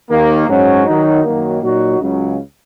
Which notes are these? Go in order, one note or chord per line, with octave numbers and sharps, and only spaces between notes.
D#2 D#3 A#3
G#2 F#3 C#4
D#3 F#3 D#4
F#2 D#3 F#3 A#3
A#2 F#3 D#4 F#4
C#2 C#3 F#3